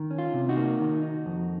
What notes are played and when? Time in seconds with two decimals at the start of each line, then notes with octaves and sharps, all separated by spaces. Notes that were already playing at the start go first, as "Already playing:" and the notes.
Already playing: D#3
0.11 C#4
0.18 F4
0.34 C3
0.49 D#4 F#4
0.57 A#3
0.80 D#3
1.03 D#4
1.26 F2